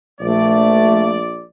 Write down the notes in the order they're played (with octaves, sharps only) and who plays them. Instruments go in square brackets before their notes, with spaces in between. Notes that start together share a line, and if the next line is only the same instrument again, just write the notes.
[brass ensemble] A#1 D5 [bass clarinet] A3